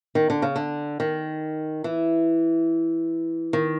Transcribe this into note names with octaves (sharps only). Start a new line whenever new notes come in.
D#3
D3
C#3
D3
D#3
E3
D#3